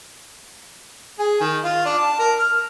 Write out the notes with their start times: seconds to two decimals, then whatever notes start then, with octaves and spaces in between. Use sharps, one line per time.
1.19 G#4
1.41 D#3
1.64 F4
1.85 D4
1.98 A5
2.19 A#4
2.39 F6